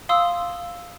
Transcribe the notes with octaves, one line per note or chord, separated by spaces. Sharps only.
F5 C6 D#6 E6